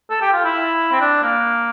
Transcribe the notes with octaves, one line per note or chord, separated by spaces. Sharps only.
A4
G4
F4
E4
C4
D4
A#3